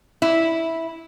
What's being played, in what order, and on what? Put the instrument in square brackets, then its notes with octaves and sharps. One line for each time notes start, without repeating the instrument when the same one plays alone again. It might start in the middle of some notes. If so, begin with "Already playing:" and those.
[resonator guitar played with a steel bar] E4